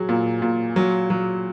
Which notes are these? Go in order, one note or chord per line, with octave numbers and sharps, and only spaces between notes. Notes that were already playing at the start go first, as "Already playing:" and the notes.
Already playing: F#3 G#4
A#2
A#2
F#3
F#3